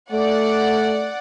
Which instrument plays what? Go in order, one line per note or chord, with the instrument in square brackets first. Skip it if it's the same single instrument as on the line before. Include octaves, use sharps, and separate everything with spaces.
[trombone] A3 [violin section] D5 F#5